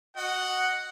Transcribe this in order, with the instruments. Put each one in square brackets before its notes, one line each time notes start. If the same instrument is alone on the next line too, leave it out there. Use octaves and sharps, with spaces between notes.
[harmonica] F#4 D#5 [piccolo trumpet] F#5